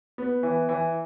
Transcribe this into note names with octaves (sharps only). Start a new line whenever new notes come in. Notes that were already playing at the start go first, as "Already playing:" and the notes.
B3
E3
E3